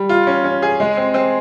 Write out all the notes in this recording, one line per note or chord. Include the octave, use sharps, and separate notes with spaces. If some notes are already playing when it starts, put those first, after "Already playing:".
Already playing: G3
F4
C#4
C#4
G#4
G#3
C4
C4